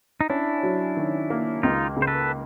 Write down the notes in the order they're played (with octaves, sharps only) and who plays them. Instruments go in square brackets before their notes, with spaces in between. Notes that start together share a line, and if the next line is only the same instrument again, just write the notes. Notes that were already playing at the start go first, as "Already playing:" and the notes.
[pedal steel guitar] D#4
[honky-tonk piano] C#4 [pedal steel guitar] D4 E4
[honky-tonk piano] F#3
D#3
A#3
[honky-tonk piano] C#2 [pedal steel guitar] D#4 F4
[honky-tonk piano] C#3
[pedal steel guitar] C5
A4 B4